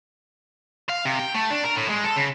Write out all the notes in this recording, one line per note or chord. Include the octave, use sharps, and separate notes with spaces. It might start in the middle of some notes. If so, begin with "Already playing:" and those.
F5
C3
G5
A3
D4
A#4
A2
G#3
A4
C#3